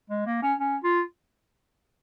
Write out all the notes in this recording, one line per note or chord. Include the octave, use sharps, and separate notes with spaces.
G#3
A#3
C#4
C#4
F4